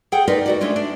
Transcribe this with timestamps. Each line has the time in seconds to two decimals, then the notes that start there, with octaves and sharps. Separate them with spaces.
0.12 G#4 A4 F#5 G5
0.28 D#4 F4 A#4 B4 D5 D#5
0.46 D2 F#4 D5
0.61 G#3 A3 C#4 D4 F4
0.76 D4